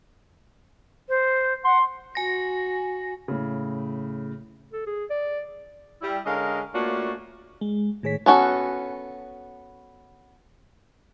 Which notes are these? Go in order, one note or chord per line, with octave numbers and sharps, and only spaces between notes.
C5
F#5 C6
F#4 G#5 A#6
A2 C#3
A4
G#4
D5
G3 E4
D3 G#3 C#4 A#4 D#5 F5
A3 A#3 C#4 D4 F4 F#4
G#3
A2 D#3 G#4 C#5 B6
B3 C#4 F#4 A4